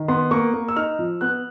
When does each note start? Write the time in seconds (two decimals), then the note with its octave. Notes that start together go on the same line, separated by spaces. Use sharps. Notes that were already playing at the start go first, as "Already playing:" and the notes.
Already playing: D#3
0.08 B3 C6
0.31 A#3 C#6
0.54 A#3
0.68 E6
0.76 D#4 F6
0.99 F3
1.21 B3 F#6